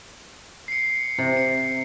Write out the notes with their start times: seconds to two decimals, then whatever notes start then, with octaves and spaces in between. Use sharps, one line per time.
0.68 C7 C#7
1.18 C3
1.37 C#7